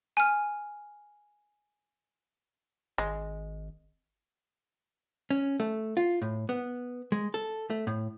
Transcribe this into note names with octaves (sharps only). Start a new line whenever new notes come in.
G#5 F6
G#1 G#3
C#4
A3
F4
A2
B3
G#3
A4
A3
A2